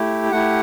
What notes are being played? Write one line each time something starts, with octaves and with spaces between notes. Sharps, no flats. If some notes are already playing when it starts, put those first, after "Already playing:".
Already playing: A3 E4 G4
A3 E4 G4 F#5